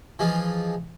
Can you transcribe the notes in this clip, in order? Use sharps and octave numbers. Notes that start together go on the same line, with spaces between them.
E3 F3 G#3 F4